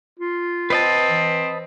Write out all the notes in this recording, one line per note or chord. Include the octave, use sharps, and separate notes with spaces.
F4
C4 B4 D#5 A5
E3